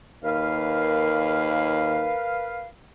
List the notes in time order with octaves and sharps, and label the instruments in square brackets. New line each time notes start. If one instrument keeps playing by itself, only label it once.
[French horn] D#2 [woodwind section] A#4 B4 F5